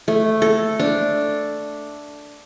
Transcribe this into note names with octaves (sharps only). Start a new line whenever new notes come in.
A3
A4
D4